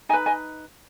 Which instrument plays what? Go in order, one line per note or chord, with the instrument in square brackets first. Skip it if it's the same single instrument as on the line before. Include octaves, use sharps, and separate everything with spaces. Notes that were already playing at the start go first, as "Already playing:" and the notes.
[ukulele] D#4 D#5 G#5
B4
D#5 G#5